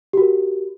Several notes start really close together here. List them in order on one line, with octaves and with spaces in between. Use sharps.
G4 F#4 A#4